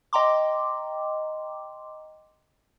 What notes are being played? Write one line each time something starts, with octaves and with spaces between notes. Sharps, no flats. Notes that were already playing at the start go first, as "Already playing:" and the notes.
D#5 G5 A#5 C6 D6